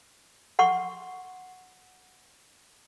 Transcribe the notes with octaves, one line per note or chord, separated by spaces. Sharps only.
F#5 C6 C#6